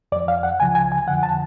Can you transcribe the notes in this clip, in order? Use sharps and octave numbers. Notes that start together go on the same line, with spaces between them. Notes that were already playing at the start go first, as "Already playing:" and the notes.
F2 F3 D5
F5
F#5
C#2 C#3 F3 G#5
G#5
G#5
F2 D3 F3 F#5
A5